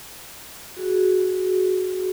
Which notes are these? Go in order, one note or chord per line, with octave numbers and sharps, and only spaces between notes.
F#4 G#4